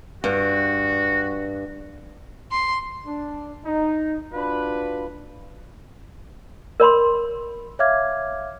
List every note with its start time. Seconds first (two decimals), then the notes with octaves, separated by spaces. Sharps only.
0.24 G2 F#4
2.51 C6
3.06 D4
3.65 D#4
4.34 D4 F4 F#4 B4
6.80 A#4 C#5 B5 C6
7.79 C#5 E5 F5 D6 F6 G#6